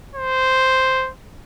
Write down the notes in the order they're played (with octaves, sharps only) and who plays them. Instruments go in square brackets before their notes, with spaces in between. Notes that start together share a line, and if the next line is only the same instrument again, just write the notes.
[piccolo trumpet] C5